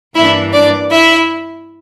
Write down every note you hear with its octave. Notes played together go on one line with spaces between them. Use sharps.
G2 E3 A#3 D4 E4 E5
D4 D5
E4 E5